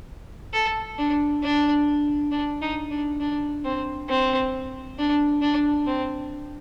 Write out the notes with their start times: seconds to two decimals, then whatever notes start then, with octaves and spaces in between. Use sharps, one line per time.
0.54 A4
0.98 D4
1.43 D4
2.31 D4
2.62 D#4
2.90 D4
3.20 D4
3.65 C4
4.09 C4
4.98 D4
5.42 D4
5.87 C4